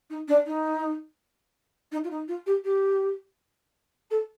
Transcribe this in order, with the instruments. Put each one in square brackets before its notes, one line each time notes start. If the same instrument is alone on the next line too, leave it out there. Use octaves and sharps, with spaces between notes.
[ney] D#4
D4
D#4
D#4
F4
D#4
F4
G4
G4
A4